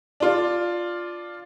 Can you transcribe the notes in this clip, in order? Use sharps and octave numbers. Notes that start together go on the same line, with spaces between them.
D4 F4